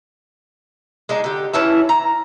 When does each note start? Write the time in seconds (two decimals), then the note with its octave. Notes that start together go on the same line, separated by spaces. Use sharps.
1.09 G#3 D4 D#4
1.24 D3 G4
1.53 E3 C#4 E4 A5
1.89 A#5